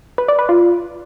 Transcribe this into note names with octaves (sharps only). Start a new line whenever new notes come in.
B4
D5
B4
F4